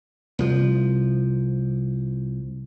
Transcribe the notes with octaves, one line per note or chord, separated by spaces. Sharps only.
C2 F3